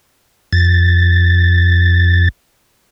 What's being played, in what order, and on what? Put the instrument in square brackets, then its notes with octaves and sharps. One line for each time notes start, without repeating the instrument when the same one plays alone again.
[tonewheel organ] F2 A6